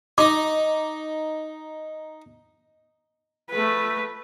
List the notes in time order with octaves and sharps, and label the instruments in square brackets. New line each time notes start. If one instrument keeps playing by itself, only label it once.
[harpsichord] D#4 [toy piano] D6
[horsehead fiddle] A3 B4